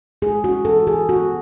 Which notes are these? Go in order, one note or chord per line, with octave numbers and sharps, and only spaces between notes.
G#3 G#4
C#4 F#4
E3 A4
E3 G#4
B3 F#4